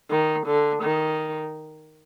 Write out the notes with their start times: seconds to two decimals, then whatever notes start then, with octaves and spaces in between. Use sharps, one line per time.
0.10 D#3
0.47 D3
0.83 D#3